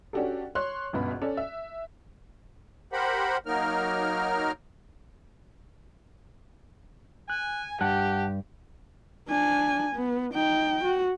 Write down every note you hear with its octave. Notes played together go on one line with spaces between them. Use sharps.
C#4 D4 F#4 G4 A4
C#5 C6 F#6
G1 C#2 B2 F#4 B5
C#4 A4 D5
E5
G4 A#4 C5 F#5 B5
F#3 A#3 D#4 A#4 F6
G#5 F#6
G2 G4 F#5 A5 F#6
D4 G#5
B3
D#4 G5
F#4